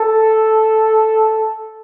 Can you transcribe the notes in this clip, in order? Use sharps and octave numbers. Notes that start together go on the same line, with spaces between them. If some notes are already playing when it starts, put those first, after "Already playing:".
Already playing: A4